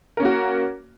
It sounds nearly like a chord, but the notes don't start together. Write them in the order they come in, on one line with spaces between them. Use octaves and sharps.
A#4 C#4 A#3 F#4